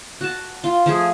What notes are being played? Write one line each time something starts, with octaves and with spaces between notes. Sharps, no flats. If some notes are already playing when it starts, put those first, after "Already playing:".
F#4 A5
F4
F3 A3 G#4